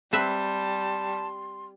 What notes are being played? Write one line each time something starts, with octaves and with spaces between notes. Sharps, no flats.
G3 C4 B4 E5 A5 C6